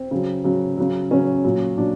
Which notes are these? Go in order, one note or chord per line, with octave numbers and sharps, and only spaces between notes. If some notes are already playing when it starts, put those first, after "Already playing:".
Already playing: C4
C#3 F#3
C#3 F#3
C#3 F#3
C#3 F#3 C#4
A#2 F#3
A#2 F#3 D4